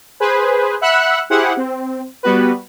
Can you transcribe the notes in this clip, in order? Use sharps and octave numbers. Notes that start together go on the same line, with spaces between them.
G#4 B4 C5
E5 F#5 B5 E6 F#6
E4 G4 G#4 C5 F#5
C4
G3 B3 F#4 B4